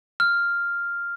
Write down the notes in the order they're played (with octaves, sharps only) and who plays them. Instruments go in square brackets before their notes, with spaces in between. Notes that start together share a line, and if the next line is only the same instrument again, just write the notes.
[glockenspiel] F6